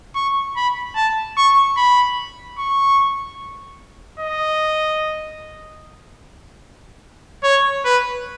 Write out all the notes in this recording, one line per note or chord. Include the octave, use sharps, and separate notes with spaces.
C#6
B5
A5
C#6
B5
C#6
D#5
C#5
B4